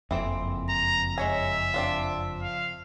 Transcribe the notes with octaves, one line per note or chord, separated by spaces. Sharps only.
F#1 F2 E3 C4
A#5
G#3 C#5 E5 G#5
C4 D4 F4
F5